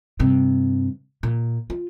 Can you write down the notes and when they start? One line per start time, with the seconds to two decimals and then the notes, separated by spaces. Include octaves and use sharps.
0.20 G2 C3
1.23 A#2
1.70 F4